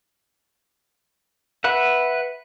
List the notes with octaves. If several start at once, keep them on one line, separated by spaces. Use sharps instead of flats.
B4 E5 F#5